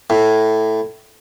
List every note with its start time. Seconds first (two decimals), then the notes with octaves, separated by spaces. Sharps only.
0.10 A2